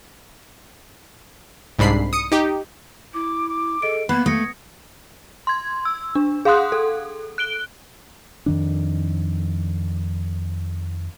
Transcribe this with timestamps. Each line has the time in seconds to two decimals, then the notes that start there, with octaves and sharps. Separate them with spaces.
1.79 C2 G#2 D4 B5 C7
2.13 D#6 C#7
2.32 D#4 G4
3.13 E4 D6
3.48 D6
3.82 G#4 A4 D#5 D7
4.09 A#3 B3 B5 F#6 G#6
4.26 A3 D#6 G#6 A#6 C#7
5.47 C6 G#6
5.85 E6
6.15 D4
6.45 G#4 F5 F#5 C6 D#6 F#6
6.72 A4
7.38 F#6 D7 G7
8.46 F2 D#3 D4